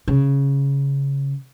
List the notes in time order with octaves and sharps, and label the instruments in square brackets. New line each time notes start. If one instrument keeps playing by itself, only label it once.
[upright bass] C#3